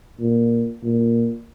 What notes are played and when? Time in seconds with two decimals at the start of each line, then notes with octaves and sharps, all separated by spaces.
0.20 A#2
0.83 A#2